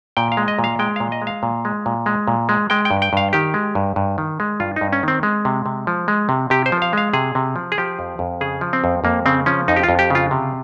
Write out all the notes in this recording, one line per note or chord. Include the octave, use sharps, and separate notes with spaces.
A#2 G5
F5
G#3
D#5
A#2
F5
G#3 G5
A#2 F5
D#5
G#3
F5
A#2
G#3
A#2
G#3
A#2
G#3
G#3 G5
G5
G2
G5
G2 F5
D#3 G4
G#3
G2
G2
D#3
G#3
G2 F4
G2 D#4
C#4
D#3 C4
G#3
C3
C3
F3
G#3
C3
C3 G4
C5
F3
F5
G#3 F5
C3 G#4
C3
F3
G#4
F3 G4
F2
F2
C#3 G#4
F3
C4
F2
F2 A#3
C#3 C4
F3 C#4
F2 D#4
G4
F4
F2
G4
C#3 F4
C3